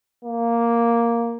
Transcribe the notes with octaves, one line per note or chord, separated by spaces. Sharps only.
A#3